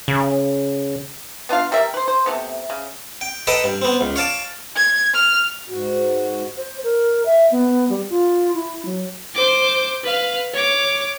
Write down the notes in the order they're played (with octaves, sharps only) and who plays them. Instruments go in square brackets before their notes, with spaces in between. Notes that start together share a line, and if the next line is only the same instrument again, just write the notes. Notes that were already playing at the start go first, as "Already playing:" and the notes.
[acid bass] C#3
[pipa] B3 D4 F4 F5
G3 A#4 E5
B4 C5
C5
C3 A3 B3
C#3
[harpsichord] G5
A4 B4 D#5 G5 A5 A#5
G2
B3 C4
C#2
C#5 F5 A5 D6
[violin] G#6
F6
[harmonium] G#2 F#4
[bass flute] C5
A#4
E5
B3
G3
F4
E4
F#3
[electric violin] C5 D6
B4 F5
C#5 D6